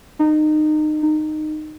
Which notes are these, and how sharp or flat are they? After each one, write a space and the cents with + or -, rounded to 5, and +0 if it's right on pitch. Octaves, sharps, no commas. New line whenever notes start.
D#4 -25
D#4 -20